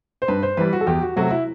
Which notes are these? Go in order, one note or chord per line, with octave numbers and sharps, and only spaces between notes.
C5
G2 B4
C5
E3 G3 B4
F#4
A4
E2 G4
F#4
C3 F#3 A3 F#4
E4